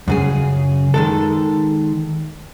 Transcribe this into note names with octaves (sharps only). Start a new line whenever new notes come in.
F#2 C#3 G#4
D#3 G#3 A4